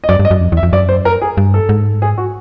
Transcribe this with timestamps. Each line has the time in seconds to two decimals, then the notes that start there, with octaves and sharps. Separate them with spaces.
0.04 D#5
0.09 F#2 D5
0.20 G2
0.25 D#5
0.31 F#2
0.41 F2
0.52 E2
0.57 E5
0.63 F2
0.73 F#2 D5
0.89 C5
1.05 A#4
1.22 G#4
1.37 G2
1.54 A4
1.69 G#2
2.02 G#4
2.18 F#4